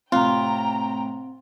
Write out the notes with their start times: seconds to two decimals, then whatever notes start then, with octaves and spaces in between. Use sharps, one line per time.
0.12 A2 C3 C4 F4 G5 A#5